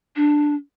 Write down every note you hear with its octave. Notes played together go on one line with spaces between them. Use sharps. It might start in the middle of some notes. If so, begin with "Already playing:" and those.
D4